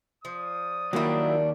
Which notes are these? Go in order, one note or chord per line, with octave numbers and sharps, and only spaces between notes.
F3 D5 D#6
D#2 F#3 G3 A#3 D4 E4